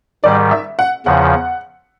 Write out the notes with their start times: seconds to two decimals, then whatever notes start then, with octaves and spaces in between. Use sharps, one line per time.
0.24 G#2 D#3 G3 D5
0.51 E5
0.79 F#5
1.06 E2 C#3 F3 F#5